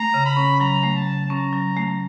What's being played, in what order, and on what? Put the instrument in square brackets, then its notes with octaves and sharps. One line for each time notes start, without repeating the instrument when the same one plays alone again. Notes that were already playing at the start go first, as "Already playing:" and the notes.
Already playing: [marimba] A3 [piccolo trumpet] A#5
[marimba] C#3
[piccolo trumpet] B5
[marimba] C#4
[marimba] F#3 [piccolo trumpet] A#5
[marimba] A3
[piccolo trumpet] A5
[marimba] C#3
[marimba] C#4 [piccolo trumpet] A#5
[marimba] F#3
A3